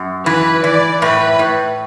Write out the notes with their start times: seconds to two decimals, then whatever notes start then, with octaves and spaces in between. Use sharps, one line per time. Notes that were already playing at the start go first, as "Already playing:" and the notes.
Already playing: F#2
0.26 E3 B4
0.64 E3 D5
1.01 A2 B4
1.39 A2